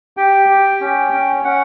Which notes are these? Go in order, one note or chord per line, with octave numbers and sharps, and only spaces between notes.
G4 G5
G4
C#4
C#4
C#4 F#5